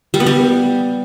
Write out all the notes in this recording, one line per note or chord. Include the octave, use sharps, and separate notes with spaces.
G3
B3
G3